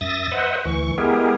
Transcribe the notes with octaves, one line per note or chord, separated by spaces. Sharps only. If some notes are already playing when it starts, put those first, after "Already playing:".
F#2 E5 D#6 A6 A#6
B4 C5 D#5 E5 F#5
D2 E3 C#6
G#3 B3 E4 G4 G#4 A#4